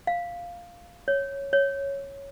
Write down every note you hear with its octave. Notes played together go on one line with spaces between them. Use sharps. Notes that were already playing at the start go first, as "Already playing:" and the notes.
F5
C#5
C#5